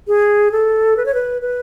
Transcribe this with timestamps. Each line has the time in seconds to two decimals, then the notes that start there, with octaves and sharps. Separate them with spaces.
0.08 G#4
0.52 A4
0.97 B4
1.06 C#5
1.14 B4
1.42 B4